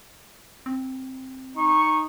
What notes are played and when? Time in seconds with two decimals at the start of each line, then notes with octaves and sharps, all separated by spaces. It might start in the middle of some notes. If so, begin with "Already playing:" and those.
0.66 C4
1.56 D#4 C#6